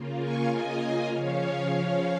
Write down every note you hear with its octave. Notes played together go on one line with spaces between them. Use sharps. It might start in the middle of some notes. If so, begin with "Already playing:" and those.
Already playing: C#3 A#3 F4
G#5 C#6
D#5 G#5
C#3 F3 C#4 C#5 F5